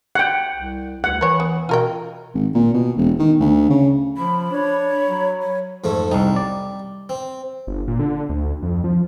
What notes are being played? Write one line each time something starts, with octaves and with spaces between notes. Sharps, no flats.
F#5 G5
C2
D2 F#5
E3 B4 C#5
B3
B2 F4 A#4 G5
G#1
A#2
B2
E1
D#3
D2
C#3
F3 B5
D4 C#5
B5
F#3
C#5
F2 G#2 A3
C2 G3 D#4
D5
C4
G1
A#2
D3
D2
F2
F3